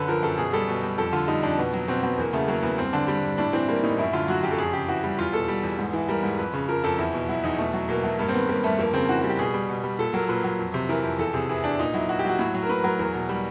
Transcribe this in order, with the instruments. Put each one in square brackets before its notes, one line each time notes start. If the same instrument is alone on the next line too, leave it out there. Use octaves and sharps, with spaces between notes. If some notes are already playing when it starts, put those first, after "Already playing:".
Already playing: [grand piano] F#2 D3 A4 B4
F3 A#4
F#2 A4
B2 G#4
G3 A4
B2
G3
F2 A4
D3 F4
G3 D#4
F2 D4
B2 B3
F#3
B2 C4
F#3 B3
E2 A#3
C#3 A3
F#3 A#3
E2 B3
G2 C4
D3 D4
G3
G2
A2 D4
E3 C4
G3 A#3
A2 D#4
F#2 E4
D3 F4
F#3 F#4
F#2 G4
A4
F2 G#4
C#3 G4
E3 F#4
G3
E2 F4
B2 A4
G3
E2
G#2
E3
G3 A#4
G#2
F2 B4
C#3
F3 A#4
F2 A4
E2 E4
B2
F#3 E4
E2 D#4
B2 A3
F#3
B2 A#3
F#3 A3
G2 A#3
C4
D#3 B3
G3 A#3
G2 A3
F2 A#3
C#3 C4
E3 F#4
G3 F#4
G4
B2 G#4
G3
B2
G3
A#2 A4
F#3 A#4
A#2 B4
F#3
F2
C3
E3 A#4
F2
E2 A4
C3 G#4
E3 G#4
E2 D4
A#2 D#4
F#3 E4
A#2 F#4
G4
F#3 F#4
A2
F#3
A#4
A2 B4
F#3 A#4
E2 A#4
B2
G3